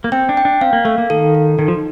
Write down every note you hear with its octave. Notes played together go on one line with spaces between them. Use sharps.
A#3
C4 G5
D4
G5
D4
C4 F5
A#3
A3 F5
A#3
D#3 A4
A4
D#3 D#4
F3